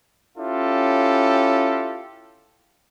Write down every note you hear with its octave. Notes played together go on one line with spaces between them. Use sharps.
C#4 E4 F4 G4 A4